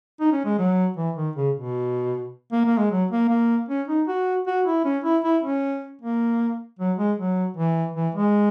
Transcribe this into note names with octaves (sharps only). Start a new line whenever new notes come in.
D#4
C#4
G#3
F#3
E3
D#3
C#3
B2
A#3
A#3
G#3
F#3
A#3
A#3
C#4
D#4
F#4
F#4
E4
C#4
E4
E4
C#4
A#3
F#3
G#3
F#3
E3
E3
G#3